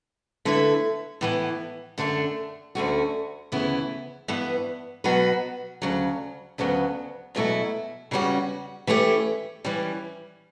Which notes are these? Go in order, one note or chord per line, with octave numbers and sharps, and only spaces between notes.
D3 A3 E4 B4
A2 E3 B3
F#2 D3 A3 D4
D2 D3 A3 C#4 F#4
D2 C#3 E3 B3 E4
G2 E3 B3
B2 F#3 B3 F#4 B4
D2 C#3 F#3
D2 C#3 F#3 B3
E2 B2 F#3 A3 E4
E2 C#3 G3 C#4 F#4
E3 A3 C#4 E4 G4
E3 G3 C#4